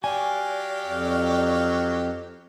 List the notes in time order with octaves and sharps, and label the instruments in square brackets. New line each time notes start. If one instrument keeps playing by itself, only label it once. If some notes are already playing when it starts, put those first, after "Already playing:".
[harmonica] F#3 G4 F5 [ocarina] D5 [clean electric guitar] G#5
[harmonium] F2